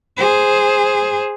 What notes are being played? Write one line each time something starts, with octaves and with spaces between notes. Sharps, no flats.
G#4 C5